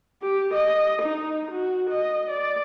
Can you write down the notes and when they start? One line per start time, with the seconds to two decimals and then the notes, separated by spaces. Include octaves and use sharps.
0.23 G4
0.54 D#5
1.02 D#4
1.51 F#4
1.90 D#5
2.30 D5